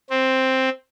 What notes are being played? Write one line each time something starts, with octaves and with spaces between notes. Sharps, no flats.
C4